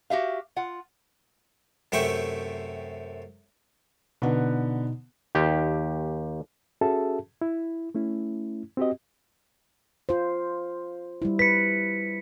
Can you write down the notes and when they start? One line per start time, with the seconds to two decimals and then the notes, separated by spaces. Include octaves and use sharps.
0.10 F#4 G4 E5 F5
0.56 F4 F#5
1.92 F#2 C3 A3 E5 G5 C#6
4.22 B2 D3 B3 D#4
5.35 D#2 G4
6.81 C#4 F#4 G#4 A4 E5 A5
7.41 E4
7.95 A3 C#4 E4
8.77 C4 F#4 G4 D#5
10.09 F4 C5
11.22 G3 E4
11.39 B4 B6 C#7